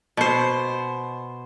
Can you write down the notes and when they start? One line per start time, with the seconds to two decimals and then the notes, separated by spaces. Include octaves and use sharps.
0.17 B2 C5